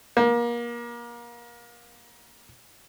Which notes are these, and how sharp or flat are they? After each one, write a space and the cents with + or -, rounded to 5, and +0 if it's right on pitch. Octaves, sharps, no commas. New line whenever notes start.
A#3 +30